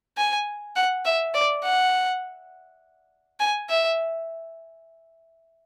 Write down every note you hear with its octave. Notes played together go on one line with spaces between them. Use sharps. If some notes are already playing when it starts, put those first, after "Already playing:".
G#5
F#5
E5
D5
F#5
G#5
E5